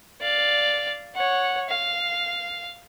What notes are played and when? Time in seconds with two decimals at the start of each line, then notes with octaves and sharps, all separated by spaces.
0.21 D5 F5
1.15 C#5 F#5
1.69 F5